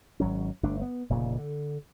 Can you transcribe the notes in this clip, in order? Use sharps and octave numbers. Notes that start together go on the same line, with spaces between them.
G#1 F#3 C#4
G1 A3 D4
B3
F1 A#2 C#3
D3